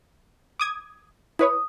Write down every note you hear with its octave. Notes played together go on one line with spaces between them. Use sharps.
D6 D#6 G#6
E4 B4 C#5 D#6